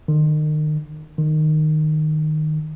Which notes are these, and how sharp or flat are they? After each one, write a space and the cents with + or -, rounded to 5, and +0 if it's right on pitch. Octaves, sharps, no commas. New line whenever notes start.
D#3 -35
D#3 -15